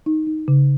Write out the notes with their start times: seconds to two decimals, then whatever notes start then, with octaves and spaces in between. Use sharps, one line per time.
0.06 D#4
0.27 D#4
0.48 C#3